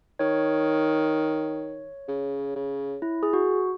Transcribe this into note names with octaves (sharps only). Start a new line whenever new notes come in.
D#3 C#5
C#3
C#3
E4
G#4
F#4